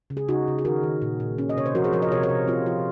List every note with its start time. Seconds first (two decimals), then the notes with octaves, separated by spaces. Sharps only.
0.10 C#3
0.17 G#4
0.29 C#3 D#4 F#4
0.48 C#3
0.58 G#4
0.65 D#3 F#4 A#4
0.83 D#3
1.02 A#2
1.20 A#2
1.38 C#4
1.49 D#5
1.57 C3 C#5
1.66 C5
1.75 F3 F#4 A#4
1.84 G#4 C5
1.93 F3 A#4 C#5
2.02 C5 D#5
2.12 C3 A#4 C#5
2.23 A#4 C#5
2.30 C3
2.48 C4 F4
2.66 F3 F4